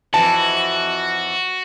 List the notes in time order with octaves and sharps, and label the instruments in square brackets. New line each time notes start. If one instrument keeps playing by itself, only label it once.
[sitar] F2 E3 [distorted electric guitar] F#4 [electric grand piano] A5